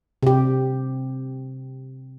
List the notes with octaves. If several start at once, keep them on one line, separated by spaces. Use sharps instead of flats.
C3 G4